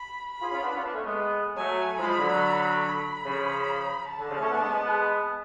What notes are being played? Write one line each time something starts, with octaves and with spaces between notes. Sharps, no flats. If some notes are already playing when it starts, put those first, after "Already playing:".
Already playing: B5
B5
F4 G#4
C#4 F4
B3 D4
C#4 F4
B3 D4
A3 C#4
G#3 B3
F#3 A3 G#5
F3 G#3 B5
D3 F#3
B5
C#3 F3
A5
D3
C#3 F3
A3 C#4
B3 D4
G#3 B3
G#3 B3
G#3 B3